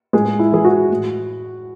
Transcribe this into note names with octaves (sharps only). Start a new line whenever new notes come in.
A2 G#3 G#4
E4
E3 G#4
F#4
A2